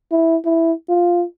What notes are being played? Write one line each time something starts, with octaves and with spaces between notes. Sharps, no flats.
E4
E4
F4